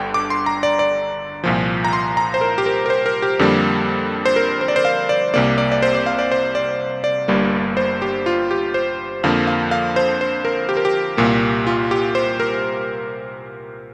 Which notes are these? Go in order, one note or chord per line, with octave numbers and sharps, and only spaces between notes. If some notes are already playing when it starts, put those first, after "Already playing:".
Already playing: G1 G2 D3 G5
D6
C6
A#5
D5
D5
C2 A#2 F3
A#5
C6
A#5
C5
A#4
G4
A#4
A#4
C5
A#4
G4
F2 D3 G3 A#3
C5
A#4
C5
D5
C5
F5
D5
C2 C3 A#3 D5
D5
D5
C5
D5
F5
D5
C5
D5
D5
G1 G2 G3 A#3
C5
G4
F4
G4
C5
F2 D3 F3 A#3 F5
F5
F5
C5
C5
A#4
G4
A#4
G4
C2 A#2 A#3
F4
G4
C5
A#4